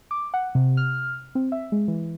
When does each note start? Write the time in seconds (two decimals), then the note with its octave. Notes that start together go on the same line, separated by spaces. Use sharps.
0.11 D6
0.34 F#5
0.55 C3
0.77 F6
1.35 C4
1.52 E5
1.72 G#3
1.88 E3